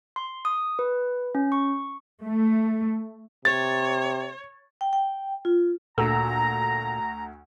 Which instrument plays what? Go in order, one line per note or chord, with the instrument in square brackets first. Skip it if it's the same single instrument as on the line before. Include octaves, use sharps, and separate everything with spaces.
[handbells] C6
D#6
B4
C#4
C#6
[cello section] A3
[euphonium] C3 [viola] C#5 [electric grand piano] A6
[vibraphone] G5
G5
F4
[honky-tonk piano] D2 A3 E6 [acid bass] A#2 [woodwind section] A#5